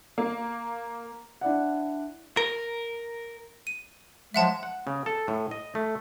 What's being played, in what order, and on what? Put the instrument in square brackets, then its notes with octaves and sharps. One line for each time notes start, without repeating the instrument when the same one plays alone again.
[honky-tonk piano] A#3
[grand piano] D4 E4 D5 F#5
[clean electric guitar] A#4
[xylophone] D#7
[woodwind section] F3 F#3 G#3 [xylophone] E5 F#5 A5
[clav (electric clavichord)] F#5
C#3
A4
A2
D#5
A3